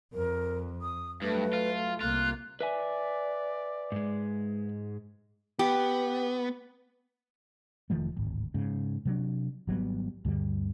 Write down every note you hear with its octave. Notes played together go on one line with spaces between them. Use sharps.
F2 A#4
D#6
G2 F#3 A3 B4
F4
C2 A#3 F4 F#6
B4 D5 E5 G#5
G#2 G#3
B3 G4
F1 D#3 F3 A3
D1 G#1
G#2 C#3
C3 F#3 A#3 D4
G#1 F#3 G3 B3
D2 G2 D3 G3